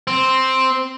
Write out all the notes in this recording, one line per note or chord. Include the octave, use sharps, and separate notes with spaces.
C4